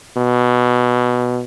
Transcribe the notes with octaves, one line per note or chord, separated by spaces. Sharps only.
B2